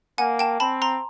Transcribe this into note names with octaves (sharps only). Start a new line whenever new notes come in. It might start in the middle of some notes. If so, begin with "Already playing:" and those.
A#3 F#5 G#5
G5 A5
C4 A5 B5
A#5 C6